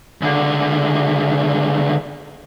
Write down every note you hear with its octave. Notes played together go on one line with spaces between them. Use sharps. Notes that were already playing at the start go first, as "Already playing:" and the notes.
C#2 D3